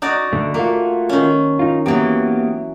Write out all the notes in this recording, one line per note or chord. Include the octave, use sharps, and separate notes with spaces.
D#4 F#4 D5
D3 A3
A3 A#3 F4 F#4
D#3 C#4
D#4 F4
E3 F#3 A#3 B3 G4